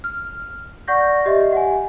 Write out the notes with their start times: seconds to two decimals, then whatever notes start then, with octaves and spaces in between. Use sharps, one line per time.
0.04 F6
0.88 D5 F#5 C#6 G6 A#6
1.26 G4 D#5 E5
1.53 F#5 G#5